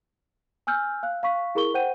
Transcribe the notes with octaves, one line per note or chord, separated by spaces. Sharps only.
G#5 E6 F6 G6
F5 F#6
F5 B5 C#6 B6
E4 G#4 A#4 B5 C#6 G7
C5 F#5 G5 G6 D#7